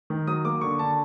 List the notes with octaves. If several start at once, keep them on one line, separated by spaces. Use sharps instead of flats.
D#3
F#3 D#6
A#3 D6
D3 C#6
D3 A5